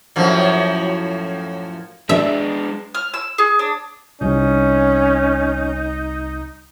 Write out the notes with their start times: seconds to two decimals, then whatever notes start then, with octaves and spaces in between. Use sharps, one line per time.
0.16 F#2 A2 F3
2.09 G#3 D4 E5
2.94 F6
3.14 E6
3.38 G#4
3.59 D4
4.21 C2 C#4 D#4